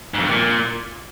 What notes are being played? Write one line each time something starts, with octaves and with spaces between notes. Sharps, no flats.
G#2
F2
G2
A#2